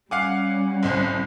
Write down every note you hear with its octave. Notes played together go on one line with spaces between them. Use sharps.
G3 C#4 F5 F#5 G#5 D6
G1 C2 C5